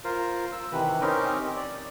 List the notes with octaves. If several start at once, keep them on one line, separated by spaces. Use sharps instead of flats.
F4 A#4 C5
E6
C3 D#3 E3 B4
C4 C#4 D#4 G4 A#4
D5